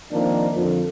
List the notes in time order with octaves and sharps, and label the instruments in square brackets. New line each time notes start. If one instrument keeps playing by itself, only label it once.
[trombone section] D#3 F3 A#3 C4 D4
F2 D3 F3